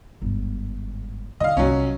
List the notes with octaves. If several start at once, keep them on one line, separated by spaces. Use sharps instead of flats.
G1 G#2
D3 F#3 D#5 F5
C2 F#3 C#4